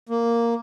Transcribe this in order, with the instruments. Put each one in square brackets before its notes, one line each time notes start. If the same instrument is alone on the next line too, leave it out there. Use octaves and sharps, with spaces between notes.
[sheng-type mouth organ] A#3